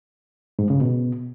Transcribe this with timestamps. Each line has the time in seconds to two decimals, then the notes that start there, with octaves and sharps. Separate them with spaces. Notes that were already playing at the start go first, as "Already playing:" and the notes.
0.59 G#2
0.70 C#3
0.81 B2